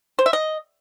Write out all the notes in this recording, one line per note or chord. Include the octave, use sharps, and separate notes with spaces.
C5
E5
D#5